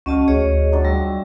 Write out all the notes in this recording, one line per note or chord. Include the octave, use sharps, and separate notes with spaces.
C#2 C#4 F#4 D#5 F5 A5
D2 G#4 C#5 D#5
F#3 D4 F4
G3 E5